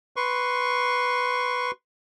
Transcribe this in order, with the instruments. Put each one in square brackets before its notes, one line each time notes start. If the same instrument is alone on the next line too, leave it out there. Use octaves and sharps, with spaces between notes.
[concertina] B4 C6 C#6